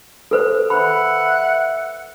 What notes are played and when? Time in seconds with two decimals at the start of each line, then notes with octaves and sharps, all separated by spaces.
0.31 A4 B4 C5
0.70 E5 F#5 B5